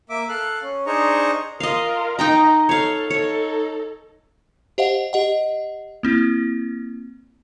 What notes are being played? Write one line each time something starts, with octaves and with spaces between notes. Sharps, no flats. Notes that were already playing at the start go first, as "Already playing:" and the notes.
A#3 E5 D6
A4 F5 F#6
C#4
D4 D#4 G#4 C5 A#5 C#6
F4 A#4 D#5 F5
D#4 D#5 G5 A#5
A4 C#5 F5
D#4 A4 C#5
G4 C5 D#5 F5 F#5
G4 D#5 F#5
A#3 C4 E4